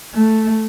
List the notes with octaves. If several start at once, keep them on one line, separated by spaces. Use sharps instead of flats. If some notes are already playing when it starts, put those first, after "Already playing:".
A3